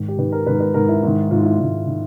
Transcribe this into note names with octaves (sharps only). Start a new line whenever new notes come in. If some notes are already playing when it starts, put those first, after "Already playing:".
Already playing: G#2 D#3
G4
G#2 D#3 B4
A#4
G#2 D#3 B4
A#4
B4
G#2 D#3 A#4
E4
G#2 D#3
G#2 D#3 F4
F4
E4
G#2 D#3
D#3